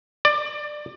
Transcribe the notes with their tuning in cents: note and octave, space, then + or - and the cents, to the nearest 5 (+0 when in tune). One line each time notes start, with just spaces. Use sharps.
D5 +20